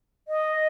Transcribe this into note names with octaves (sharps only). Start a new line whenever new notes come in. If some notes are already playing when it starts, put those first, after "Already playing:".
D#5